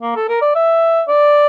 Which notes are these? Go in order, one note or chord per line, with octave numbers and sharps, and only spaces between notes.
A#3
A4
A#4
D5
E5
D5